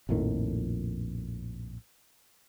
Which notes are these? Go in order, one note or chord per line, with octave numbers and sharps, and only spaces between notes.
A#1 F2 A2 D#3